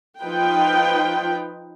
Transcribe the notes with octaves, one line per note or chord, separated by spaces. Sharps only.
F3 D#4 F4 B4 G5